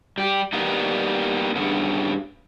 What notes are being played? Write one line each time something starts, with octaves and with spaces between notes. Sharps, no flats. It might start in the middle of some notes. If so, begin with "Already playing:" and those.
G3 G4
G3 A#3 B3 D#4
G2 C#3 B3